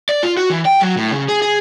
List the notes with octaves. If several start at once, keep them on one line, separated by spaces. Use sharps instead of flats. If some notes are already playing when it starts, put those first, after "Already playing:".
D5
F4
F#4
E3
G5
F#3
A2
C#3
G#4
G#4